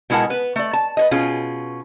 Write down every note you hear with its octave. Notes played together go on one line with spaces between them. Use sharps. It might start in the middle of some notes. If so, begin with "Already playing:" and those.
B2 G#3 E4 A#4 F#5 A5
B3 B4
A3 D5
A5
B4 C#5 D#5
B2 C#4 F4 G#4